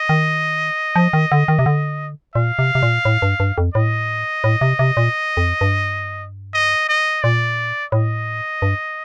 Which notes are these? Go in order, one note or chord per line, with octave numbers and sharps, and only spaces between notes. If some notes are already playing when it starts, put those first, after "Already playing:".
Already playing: D#5
D#3
F3
D#3
D3
D#3
C3
D3
A#2 F5
C3
C3
A#2
A2
G2
G2
F2
A2 D#5
A2
C3
C3
A#2
F2
G2
D#5
D#5
A#2 D5
A2 D#5
G2